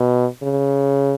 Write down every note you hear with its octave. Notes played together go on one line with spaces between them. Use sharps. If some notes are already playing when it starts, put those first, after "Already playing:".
Already playing: B2
C#3